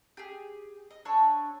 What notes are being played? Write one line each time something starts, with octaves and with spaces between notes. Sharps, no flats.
G4 G#4
D#5
D4 A4 C#5 G#5